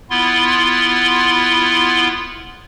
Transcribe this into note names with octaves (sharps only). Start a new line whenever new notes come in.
B3 E4 F4 C6